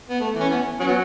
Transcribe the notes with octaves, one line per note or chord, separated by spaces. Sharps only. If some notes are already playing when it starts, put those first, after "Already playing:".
B3
A3
E3
C#4
B3
F#3 C#4
B3